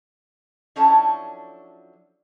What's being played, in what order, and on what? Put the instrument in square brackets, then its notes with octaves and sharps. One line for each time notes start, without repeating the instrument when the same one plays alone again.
[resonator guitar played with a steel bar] F3 F#3 C#4 D4 E4 A4